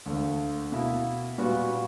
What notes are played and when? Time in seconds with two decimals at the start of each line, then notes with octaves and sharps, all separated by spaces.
0.06 D2 D3 A#3
0.72 B2 A#3 E4
1.38 A#2 G3 B3 F#4